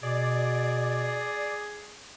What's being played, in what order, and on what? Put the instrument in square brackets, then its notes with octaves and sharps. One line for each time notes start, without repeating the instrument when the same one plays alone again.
[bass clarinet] B2 [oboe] G#4 [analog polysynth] D5